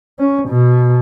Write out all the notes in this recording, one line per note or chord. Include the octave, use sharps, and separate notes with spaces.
C#4
B2